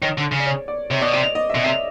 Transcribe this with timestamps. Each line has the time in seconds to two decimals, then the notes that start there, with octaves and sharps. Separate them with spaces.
0.02 D#3 C#5
0.18 D3
0.32 C#3
0.40 D5
0.46 C#5
0.68 D5
0.91 C3 C#5
1.01 B2 D5
1.13 C3 D5
1.23 D#5
1.35 D#5
1.50 E5
1.55 B2
1.64 C3 E5